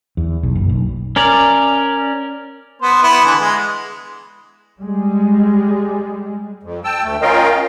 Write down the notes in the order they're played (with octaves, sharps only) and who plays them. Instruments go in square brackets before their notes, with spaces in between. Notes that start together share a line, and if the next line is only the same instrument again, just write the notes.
[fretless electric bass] E2
B1
F#1
B1
[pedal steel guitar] C#4 A#4 D5
[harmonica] B3 C5
B3 E4
D3 E3
G#3
[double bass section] G3 G#3
[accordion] F2
G5 A5 E6
D2 A3
C#4 F4 A#4 D#5 F5 G5